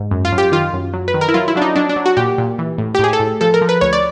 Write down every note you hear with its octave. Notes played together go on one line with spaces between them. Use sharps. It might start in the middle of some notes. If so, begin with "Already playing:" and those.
Already playing: G#2
F#2
F4
F#2
G4
D#3 F4
F#2
F#3
B4
D#3
A#4
E4
F#3 F4
E4
F#3 D4
D#4
F#3 D4
D4
F#3
F#4
A#2 G4
A#2
E3
A2
G4
A2 G#4
A4
A2
F3 A4
A#4
F3
B4
D2 C#5
D5